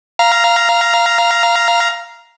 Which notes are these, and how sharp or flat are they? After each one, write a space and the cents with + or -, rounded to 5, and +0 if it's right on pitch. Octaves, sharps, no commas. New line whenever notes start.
F5 -15 A#5 +10